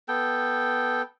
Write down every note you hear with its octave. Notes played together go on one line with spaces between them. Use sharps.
B3 A4 G5